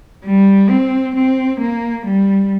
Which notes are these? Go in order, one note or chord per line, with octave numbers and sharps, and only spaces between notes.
G3
C4
C4
A#3
G3